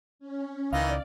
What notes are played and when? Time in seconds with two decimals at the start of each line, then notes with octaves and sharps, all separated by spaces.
0.19 C#4
0.73 C#2 D#3 E3 D5 D#5 F5